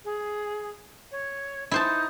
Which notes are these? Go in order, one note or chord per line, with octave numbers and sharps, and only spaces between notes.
G#4
C#5
D#4 E4 C5 A5